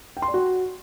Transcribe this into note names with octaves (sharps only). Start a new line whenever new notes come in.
G5
C6
D5
F#4